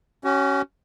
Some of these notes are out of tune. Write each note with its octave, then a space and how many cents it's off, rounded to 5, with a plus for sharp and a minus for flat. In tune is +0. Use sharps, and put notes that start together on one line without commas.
C#4 +0 F#4 +45